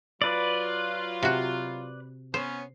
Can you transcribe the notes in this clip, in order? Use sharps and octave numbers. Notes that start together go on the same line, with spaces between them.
F#3 F4 B4 D5
C3 F#4
B3 C#4 C5